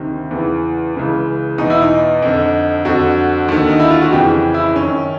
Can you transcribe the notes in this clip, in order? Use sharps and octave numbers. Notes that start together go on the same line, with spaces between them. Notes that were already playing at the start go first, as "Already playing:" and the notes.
Already playing: D2 C3 D#3
E2 C#3 E3
C#2 C#3 E3
E2 B2 D#4
E4
D#4
F2 D3
F2 D3 F#4
D#2 D3
D#4
E4
F4
F#4
F2 C#3 E3 G4
E4
F#2 D#3 C#4